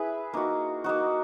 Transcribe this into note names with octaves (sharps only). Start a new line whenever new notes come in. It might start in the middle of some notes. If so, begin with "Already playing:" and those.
Already playing: E4 G#4 B4 E5
A#3 D#4 F#4
A#3 D#4 F#4